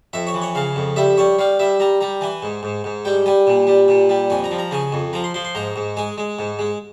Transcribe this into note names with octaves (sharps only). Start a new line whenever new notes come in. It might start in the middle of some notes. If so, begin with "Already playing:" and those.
F2 E5
C#5
E3
C#5
C#3 F5
F2
G3 E5
G3 C#5
G3 F5
G3 E5
G3 A#5
G3 A#5
E3 G#5
G#2
G#2
G#2
G3 G5
G3 G#5
A#2
G3
A#2
G3
F2 G#5
A#5
F3
A#5
C#3 G#5
F2
F3 A#5
C6
F3 C6
C6
G#2 A#5
G#2
G#3 G#5
G#3
G#2
G#3